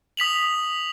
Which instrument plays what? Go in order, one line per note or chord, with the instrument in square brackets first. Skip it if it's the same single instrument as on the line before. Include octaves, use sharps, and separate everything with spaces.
[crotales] D#6 B6 F7 F#7